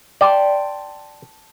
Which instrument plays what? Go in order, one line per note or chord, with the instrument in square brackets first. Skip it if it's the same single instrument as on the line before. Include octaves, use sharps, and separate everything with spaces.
[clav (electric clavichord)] D5 [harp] G5 A5 C6